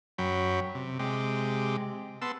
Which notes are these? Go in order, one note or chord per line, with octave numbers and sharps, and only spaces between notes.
F#2 F#3 G5 B5
C3
C3 G#3 G4
B3 A5 C6 E6